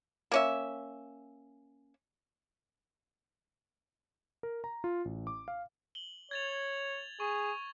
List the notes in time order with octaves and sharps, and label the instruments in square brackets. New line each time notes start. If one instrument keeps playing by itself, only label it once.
[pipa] A#3 C#4 E5
[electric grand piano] A#4
A#5
F4
A1
D6
F5
[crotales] F#7 G7
[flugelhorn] C#5 [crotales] G#6 A6 F7
[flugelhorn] G#4 [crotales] C#6